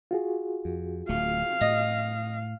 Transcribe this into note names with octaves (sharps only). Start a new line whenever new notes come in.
F4 F#4 G#4
F2
D1 A3 F5
A2 D#5